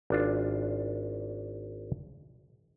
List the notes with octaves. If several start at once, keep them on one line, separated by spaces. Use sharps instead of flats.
G#1 D4 F4